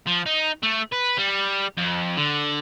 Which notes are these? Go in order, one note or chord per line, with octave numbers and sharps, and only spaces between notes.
F3
D#4
A3
B4
G3
F2
D3